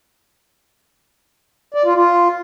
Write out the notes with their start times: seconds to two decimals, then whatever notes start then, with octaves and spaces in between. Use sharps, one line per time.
1.74 D5
1.85 F4
1.96 F4